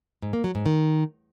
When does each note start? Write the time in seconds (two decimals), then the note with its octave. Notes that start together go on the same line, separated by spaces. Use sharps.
0.22 G#2
0.33 A#3
0.44 F#3
0.55 G#2
0.66 D#3